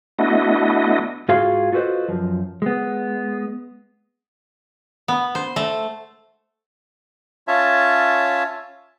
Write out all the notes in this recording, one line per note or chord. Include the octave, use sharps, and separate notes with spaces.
A3 B3 D4 E4 F#4 D#5
G#2 F4 F#4 G#4 F5 C6
F4 F#4 A4 B4 C5 D#5
F#2 F3
G#3 B3
B3
C5
A3
C#4 F4 C#5 E5 A5